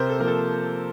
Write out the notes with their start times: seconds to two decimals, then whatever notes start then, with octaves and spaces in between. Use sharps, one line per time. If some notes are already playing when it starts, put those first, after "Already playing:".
Already playing: C3 A#4 C5
0.09 A4
0.18 F3 A#3 A#4
0.28 A4